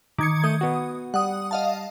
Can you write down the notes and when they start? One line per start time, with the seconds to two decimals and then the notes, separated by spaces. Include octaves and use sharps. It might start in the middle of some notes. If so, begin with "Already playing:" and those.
0.19 D#3 D6 G#6 C#7
0.44 A3 D#6 G6
0.61 B3 F#4
1.14 G3 F#5 D#6
1.51 D#5 F5 A5